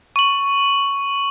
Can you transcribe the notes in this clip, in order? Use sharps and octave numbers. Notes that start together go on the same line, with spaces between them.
C#6 F#7